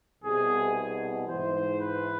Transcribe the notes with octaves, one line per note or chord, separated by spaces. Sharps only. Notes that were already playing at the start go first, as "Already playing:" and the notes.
C2 B2 G#4
G#2 E3 C5
B4